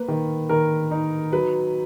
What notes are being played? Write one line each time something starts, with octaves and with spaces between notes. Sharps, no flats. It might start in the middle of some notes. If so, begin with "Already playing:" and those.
Already playing: A#3 B4
D#3
D#3 A#4
D#4
F#3 B4